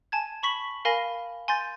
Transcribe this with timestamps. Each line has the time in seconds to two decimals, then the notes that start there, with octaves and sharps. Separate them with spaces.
0.12 G#5 A5 G#6
0.43 B5 C#6 B6 F#7
0.85 A#4 F5 G#5 B5 A#6
1.48 G#5 C6 G6 A6